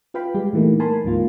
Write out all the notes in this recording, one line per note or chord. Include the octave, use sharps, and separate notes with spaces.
F4 B4 F5 G5 B5
G3 G#3 G4
A#2 E3 A3 A#3 D#4
A#4 G#5 A5 B5 C6
D2 G#2 A#3 F4